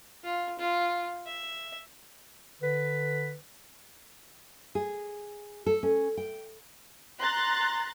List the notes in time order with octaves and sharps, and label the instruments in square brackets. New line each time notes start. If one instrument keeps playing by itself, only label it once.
[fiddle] F4
F4
E5
[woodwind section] D3 B4
[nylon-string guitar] G#4
A4
C#4
G5
[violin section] A#5 C6 F#6 A6